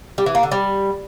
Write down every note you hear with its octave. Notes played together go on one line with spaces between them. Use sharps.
G3
E3
A#3
D3
G3